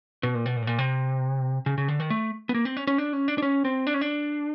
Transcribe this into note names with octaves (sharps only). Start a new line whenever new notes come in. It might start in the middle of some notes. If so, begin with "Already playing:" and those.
B2
A#2
B2
A#2
A2
A#2
C3
C#3
C#3
D3
D#3
A3
B3
A#3
C4
C#4
C#4
D4
C#4
D4
D4
C#4
C4
D4
C#4
D4